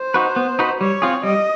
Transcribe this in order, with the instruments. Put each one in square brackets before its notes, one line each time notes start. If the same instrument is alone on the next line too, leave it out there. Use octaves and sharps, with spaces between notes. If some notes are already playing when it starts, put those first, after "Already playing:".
Already playing: [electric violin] C5
[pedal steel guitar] D#4 F#4 B4
B3
D#4 F#4 B4
[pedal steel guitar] G3 [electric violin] C#5
[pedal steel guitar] C4 F4 G#4
[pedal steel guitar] G3 [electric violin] D#5